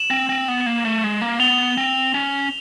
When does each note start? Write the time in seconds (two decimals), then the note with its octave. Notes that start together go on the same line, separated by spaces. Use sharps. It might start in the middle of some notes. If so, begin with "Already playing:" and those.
Already playing: E7 F#7
0.10 C4
0.29 C4
0.48 B3
0.66 A#3
0.85 A3
1.04 G#3
1.22 A#3
1.40 B3 F7 G7
1.77 C4
2.14 C#4